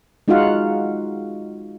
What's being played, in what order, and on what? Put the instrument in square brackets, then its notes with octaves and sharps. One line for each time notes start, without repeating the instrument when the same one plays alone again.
[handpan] G#3 D#4 F4 F#4 F5 F#5